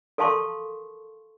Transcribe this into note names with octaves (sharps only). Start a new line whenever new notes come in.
A4 A#4 F5 A5 C6 C#6